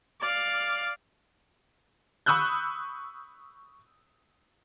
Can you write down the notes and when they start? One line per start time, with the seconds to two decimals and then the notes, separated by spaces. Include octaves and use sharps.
0.21 D5 F5
2.26 B5 C#6 D#6 E6 F#6 G6